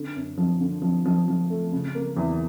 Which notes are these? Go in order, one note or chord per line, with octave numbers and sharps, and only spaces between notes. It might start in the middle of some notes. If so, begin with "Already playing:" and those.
Already playing: D3
F#2
F3
D3
F3
F3
F3
A3
C#3
A#3
E2